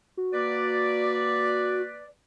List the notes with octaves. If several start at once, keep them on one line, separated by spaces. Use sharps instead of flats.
F#4
A#3 B4 D5